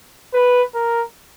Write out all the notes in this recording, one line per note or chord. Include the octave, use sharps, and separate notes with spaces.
B4
A#4